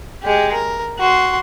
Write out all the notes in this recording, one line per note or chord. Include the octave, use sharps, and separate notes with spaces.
G#3 G4
A#4
F#4 C6